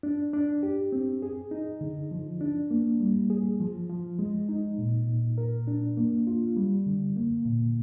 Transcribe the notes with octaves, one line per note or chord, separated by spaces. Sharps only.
D4
D4
G4
C4
G#4
D#4
D3
F3
D4
A#3
G3
G#4
F3
F3
G#3
D#4
A#2
A#2
A#4
D4
A#3
F4
G3
D3
A#3
A#2